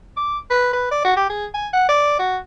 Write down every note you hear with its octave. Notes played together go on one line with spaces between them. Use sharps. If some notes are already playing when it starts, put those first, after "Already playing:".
D6
B4
B4
D5
F#4
G4
G#4
G#5
F#5
D5
F#4